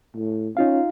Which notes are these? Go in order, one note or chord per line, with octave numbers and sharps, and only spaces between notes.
A2
C#4 D#4 F4 F5